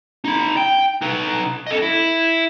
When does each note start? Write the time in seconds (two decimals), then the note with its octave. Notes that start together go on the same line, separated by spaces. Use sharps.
0.25 D#4 B5
0.57 G5
1.02 D#4 B4
1.67 A4 D#5
1.82 E4